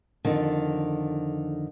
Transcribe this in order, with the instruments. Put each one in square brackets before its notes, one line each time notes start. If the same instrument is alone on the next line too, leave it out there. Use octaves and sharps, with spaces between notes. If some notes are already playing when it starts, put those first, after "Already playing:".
[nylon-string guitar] F2 D3 D#3